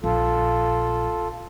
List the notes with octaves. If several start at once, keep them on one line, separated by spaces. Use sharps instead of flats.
A#1 F4 A4